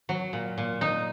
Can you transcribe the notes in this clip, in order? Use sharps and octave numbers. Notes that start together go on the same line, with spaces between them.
F#3
A#2
A#2
D#4